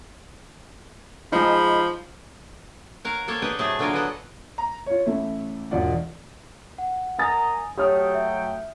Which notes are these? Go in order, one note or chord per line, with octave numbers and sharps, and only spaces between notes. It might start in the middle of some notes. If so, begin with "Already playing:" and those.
F3 G#3 D#4 B5
A#4 C#5 F5 F#5
A#3 G4 A4 C5 C#5
G4 G#4 B4 D5 D#5 G5
A2 C3 F#3 A3 G#4 A5
D3 F#3 A#3 F4 A#4 F5
B3 A4 B4 D5 D#5 F#5
A#5
F4 C#5
A1 A3 E4
E1 G#2 F4 D5 F#5
F#5
A#4 D#5 G#5 A#5 D#6 A6
F#3 A3 G4 C#5 G5 D#6 F6
E5